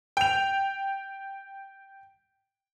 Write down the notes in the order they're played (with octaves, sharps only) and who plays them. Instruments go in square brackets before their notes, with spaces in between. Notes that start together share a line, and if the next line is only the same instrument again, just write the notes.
[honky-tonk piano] G5 F7